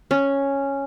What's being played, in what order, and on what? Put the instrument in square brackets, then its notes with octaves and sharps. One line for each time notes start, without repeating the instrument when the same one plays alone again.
[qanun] C#4